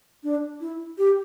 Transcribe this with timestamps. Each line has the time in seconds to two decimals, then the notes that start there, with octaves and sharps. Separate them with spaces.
0.23 D4
0.61 E4
0.98 G4